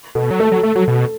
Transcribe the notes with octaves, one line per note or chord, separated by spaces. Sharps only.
B2 A4
F#3
A3 A4
F#3
A3
F#3
B2